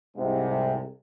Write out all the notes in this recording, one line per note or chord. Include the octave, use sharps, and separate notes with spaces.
C2 G#2 C3